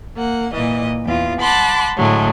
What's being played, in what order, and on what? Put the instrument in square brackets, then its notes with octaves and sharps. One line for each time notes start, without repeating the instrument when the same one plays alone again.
[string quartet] A#3 F#5
A#2 E3 D#5
E2 F4
F#5 A5 B5 C6 D6 F#6
A2 D3 F#3 G#3 A3